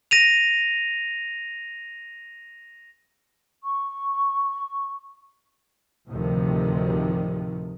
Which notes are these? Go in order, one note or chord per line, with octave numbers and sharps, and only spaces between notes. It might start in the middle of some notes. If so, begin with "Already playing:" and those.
A#6 D#7 F7
C#6
D2 A2 C3 D#3 F3